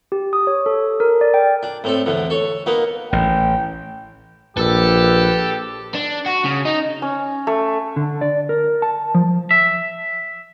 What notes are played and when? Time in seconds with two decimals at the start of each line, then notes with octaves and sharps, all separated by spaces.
0.12 G4
0.33 D#6
0.47 C#5
0.66 A4
1.00 A#4
1.21 D5
1.34 G5
1.63 D4
1.84 A2 C4 A4
2.06 E2 A2 D3
2.30 A4 C#5
2.66 A#3 B3 D#4
3.13 A1 G5
4.57 A#1 G4 A4 B4
5.95 D4
6.26 F#4
6.45 C#3
6.65 D#4
7.02 C#4
7.47 A3
7.96 D3
8.21 D5
8.49 A#4
8.82 A5
9.15 F3
9.51 E5